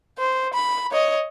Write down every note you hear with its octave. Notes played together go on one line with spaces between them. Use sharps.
C5
B5
C#5 D#5